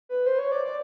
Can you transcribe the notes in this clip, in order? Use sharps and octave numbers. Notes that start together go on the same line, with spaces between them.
B4
C5
C#5
D5
D5